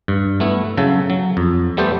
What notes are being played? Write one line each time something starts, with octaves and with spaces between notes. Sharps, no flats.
G2
A3 B3 E4
C#3 F#3 A4
F#3
F2
G3 A3 B3 G4 A4 C5